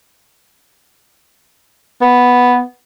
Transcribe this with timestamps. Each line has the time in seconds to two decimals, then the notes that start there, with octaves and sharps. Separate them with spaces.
2.01 B3